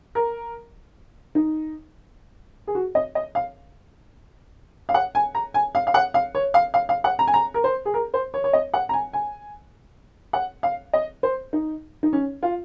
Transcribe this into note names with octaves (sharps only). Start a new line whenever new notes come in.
A#4
D#4
G#4
F#4
D#5
D#5
F5
F5
F#5
G#5
A#5
G#5
F5
F5
F#5
F5
C#5
F5
F5
F5
F#5
A#5
G#5
A#5
A#4
C5
G#4
A#4
C5
C#5
C#5
D#5
F#5
A#5
G#5
G#5
F#5
F5
D#5
C5
D#4
D#4
C#4
F4